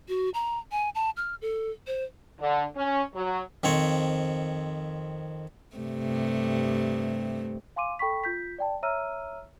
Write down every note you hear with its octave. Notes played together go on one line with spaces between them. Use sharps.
F#4
A#5
G#5
A5
F6
A4
C5
D3
C#4
F#3
F2 D#3 C4 C#5
G2 C3 A3
F5 G#5 C6 D6 D#7
A4 G5 B5 C#6 B6
F4 G6 B6
D5 G5 A5
C#5 E5 A#5 E6 F6 D#7